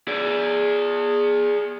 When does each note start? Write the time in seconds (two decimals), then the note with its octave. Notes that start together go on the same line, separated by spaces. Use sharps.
0.08 G#4 D5